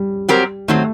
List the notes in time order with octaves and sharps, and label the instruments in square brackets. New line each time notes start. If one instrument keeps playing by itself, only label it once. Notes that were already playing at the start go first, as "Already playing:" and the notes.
Already playing: [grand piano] G3
[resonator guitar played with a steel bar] F#3 C4 G4 A#4
[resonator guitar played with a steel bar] D#3 F#3 C4 [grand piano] A3